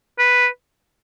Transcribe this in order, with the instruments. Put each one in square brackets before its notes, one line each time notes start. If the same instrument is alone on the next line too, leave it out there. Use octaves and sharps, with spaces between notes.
[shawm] B4